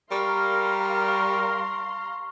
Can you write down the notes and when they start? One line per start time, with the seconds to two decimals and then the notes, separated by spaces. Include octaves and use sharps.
0.12 G3 A#4 F5 A#5 C6 C#6 F6
1.08 C#6